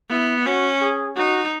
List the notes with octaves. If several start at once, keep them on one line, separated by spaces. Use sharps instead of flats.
B3 E4
C#4 F#4
G#4
D#4 F#4